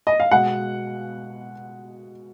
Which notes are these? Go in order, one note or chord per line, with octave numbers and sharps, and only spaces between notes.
D#5
F5
B2 G#3 F#5